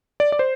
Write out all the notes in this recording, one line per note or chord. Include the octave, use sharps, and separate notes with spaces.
D5
D5
C5